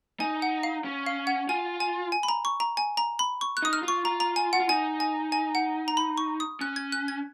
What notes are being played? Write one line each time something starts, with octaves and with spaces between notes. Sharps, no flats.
D#4 G#5
F#5
F5
C#4
F5
F#5
F4 G#5
G#5
G#5
B5
A#5
C#6
A#5
G#5
A#5
B5
C#6
F#6
D#4 D#6
F6
F4
C#6
F4 A#5
A#5
G#5
F#5
F4
D#4 G#5
G#5
G#5
F#5
A#5
B5
C#6
D#6
C#4 F#6
G#6
F#6
G#6